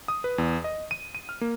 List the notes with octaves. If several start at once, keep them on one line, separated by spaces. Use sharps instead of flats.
D#6
B4
E2
D#5
D#7
D#7
F6
A#3